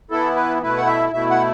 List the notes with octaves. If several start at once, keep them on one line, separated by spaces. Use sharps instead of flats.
E3 B3 E4 A4
B4
B2 A3 E4 B4
F#5
E5
B2 A3 E4 E5
F#5